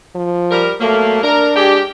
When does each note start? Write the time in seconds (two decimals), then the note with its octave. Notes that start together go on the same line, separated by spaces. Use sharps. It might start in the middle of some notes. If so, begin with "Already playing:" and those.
0.15 F3
0.51 G3 A#4
0.81 B2 F#3 A3 A#3
1.23 D4 A#4
1.56 G#3 G4